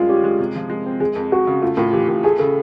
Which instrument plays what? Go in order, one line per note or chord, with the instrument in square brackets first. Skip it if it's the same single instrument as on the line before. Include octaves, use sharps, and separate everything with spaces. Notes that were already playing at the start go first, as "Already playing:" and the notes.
Already playing: [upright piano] F#2 G3 G#3 [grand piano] F4
[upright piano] C#4 [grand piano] G4
[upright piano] G#3
C3
F3
G#3
C4
[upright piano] G#3 [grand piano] G#4
[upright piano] F2
[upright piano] F2 [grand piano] F#4
[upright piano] C#3
[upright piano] A3 [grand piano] F4
[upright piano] A2 [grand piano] F4
[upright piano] E3 [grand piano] G4
[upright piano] A2
[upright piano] A3 [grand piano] G#4
[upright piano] C#3 [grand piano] A4